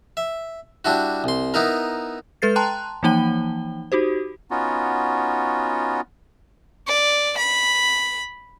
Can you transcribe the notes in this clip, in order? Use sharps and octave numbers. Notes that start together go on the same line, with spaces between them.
E5
G3 D4 E4 F#4
C2 C6
B3 D#4 E4 A#4
G#3 A4 B4 A6 C7
G5 A5 A#5 C6 F#6
E3 F3 A#3 D#4 G5 G7
D#4 F#4 G4 C5
B3 C#4 D#4 F4 F#4
D5
B5